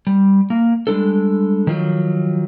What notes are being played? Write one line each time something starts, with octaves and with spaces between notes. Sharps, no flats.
G3
A#3
G3 G#3 D4 A4
D#3 F3 F#3